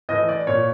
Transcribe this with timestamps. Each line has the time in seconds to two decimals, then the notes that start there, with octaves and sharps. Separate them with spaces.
0.09 A2 E3 D#5
0.29 D5
0.47 A#2 C#5